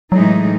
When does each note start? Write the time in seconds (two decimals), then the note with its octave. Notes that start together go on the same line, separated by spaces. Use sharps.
0.12 A2 E3 F#3 G#3 D#4